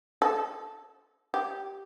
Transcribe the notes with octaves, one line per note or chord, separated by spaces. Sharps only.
A4
G4